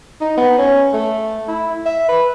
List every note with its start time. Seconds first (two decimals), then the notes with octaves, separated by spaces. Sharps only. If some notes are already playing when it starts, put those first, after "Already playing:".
0.21 D#4
0.37 B3
0.58 C#4
0.93 A3
1.48 E4
1.85 E5
2.09 B4